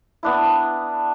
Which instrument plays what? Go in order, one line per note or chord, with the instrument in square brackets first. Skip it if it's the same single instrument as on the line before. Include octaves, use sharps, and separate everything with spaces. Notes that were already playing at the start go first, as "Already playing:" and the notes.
[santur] B3 D4 E4